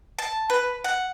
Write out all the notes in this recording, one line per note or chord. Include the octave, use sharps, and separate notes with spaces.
A5
B4
F#5